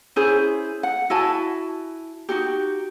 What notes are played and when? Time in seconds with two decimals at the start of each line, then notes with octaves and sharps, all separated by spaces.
0.16 C#4 E4 G#4 C5
0.83 F#5
1.10 E4 F#4 G#5 A5
2.29 D#4 F#4 G4